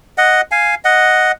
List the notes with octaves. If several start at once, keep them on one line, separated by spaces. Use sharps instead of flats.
D#5 F#5
F5 G#5
D#5 F#5